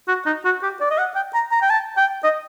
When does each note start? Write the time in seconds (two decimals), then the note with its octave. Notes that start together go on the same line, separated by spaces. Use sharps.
0.08 F#4
0.26 D#4
0.45 F#4
0.63 G4
0.81 D5
0.91 D#5
0.98 F#5
1.16 G5
1.34 A#5
1.52 A#5
1.62 G5
1.70 A5
1.97 G5
2.24 D#5